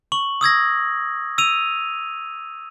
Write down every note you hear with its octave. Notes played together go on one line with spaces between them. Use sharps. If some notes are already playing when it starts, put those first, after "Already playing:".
C#6 F#7
D#6 E6 G#6 A#6
E6 D#7 F7